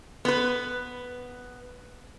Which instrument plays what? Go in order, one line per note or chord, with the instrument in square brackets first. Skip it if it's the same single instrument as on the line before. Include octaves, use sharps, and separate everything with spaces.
[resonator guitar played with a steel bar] B3 B4